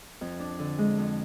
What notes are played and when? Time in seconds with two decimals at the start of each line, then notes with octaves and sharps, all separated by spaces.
0.21 F2
0.40 D4
0.59 D3
0.78 G#3
0.98 F2